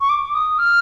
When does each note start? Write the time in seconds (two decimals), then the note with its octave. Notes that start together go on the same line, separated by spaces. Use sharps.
0.01 C#6
0.09 D6
0.34 D#6
0.59 F6